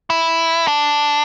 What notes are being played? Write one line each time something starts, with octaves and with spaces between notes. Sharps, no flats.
E4
D4